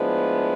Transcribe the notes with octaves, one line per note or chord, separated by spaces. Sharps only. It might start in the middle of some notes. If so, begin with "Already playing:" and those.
Already playing: A2 F3 G#3 B3 D4